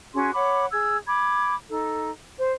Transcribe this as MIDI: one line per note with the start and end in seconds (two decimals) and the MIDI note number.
0.14 0.31 61
0.14 0.31 66
0.14 0.31 68
0.14 0.31 84
0.33 0.65 73
0.33 0.65 78
0.33 0.65 83
0.33 0.65 86
0.72 0.97 68
0.72 0.97 88
0.72 0.97 92
1.06 1.54 83
1.06 1.54 86
1.06 1.54 92
1.69 2.10 63
1.69 2.10 69
2.38 2.52 72